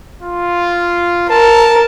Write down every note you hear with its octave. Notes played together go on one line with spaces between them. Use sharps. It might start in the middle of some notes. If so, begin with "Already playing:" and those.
F4
A#4 A5